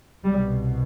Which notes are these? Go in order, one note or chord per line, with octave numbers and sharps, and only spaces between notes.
C2 B2 G3